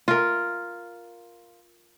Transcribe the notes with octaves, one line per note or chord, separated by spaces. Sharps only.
F4 A#4